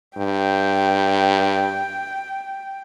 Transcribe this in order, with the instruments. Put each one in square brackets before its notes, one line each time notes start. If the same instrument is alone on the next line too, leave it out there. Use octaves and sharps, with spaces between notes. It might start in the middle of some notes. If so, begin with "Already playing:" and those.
[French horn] G2 [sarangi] G5